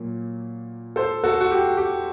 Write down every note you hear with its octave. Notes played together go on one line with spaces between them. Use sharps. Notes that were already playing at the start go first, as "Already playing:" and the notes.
Already playing: A#2 F#3 A#3
A4 C5
F#4 A4
F#4
G4
G4